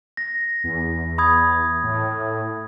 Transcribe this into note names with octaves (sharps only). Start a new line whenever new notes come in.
A#6
E2
B5 D#6 G#6
A2